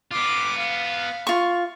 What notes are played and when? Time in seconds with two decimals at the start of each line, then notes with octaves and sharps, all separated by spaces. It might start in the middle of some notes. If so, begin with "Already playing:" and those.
0.11 B3 F4 D6
0.58 F5
1.27 F4 C#6